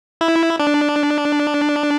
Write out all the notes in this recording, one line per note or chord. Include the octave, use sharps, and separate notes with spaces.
E4
D4